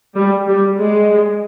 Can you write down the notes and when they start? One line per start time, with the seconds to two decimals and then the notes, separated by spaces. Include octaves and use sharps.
0.16 G3
0.48 G3
0.78 G#3